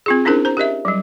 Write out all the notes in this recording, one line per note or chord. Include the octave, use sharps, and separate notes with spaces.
C4 F4 G#4
C#4 D4 E4 G#4 A#4 C5
C5 A#5
G4 A#4 D#5 E5
F#3 G3